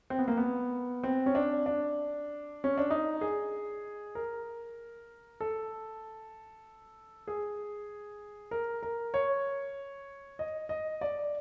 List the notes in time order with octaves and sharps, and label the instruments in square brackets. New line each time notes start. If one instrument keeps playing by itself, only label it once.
[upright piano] C4
B3
A#3
B3
C4
C#4
D4
D4
C#4
D4
D#4
G#4
A#4
A4
G#4
A#4
A#4
C#5
D#5
D#5
D5